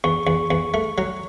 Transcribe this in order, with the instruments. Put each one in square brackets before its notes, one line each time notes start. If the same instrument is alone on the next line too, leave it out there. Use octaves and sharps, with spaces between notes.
[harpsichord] E2 [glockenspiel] C#6
[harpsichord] E2
E2
A3
F#3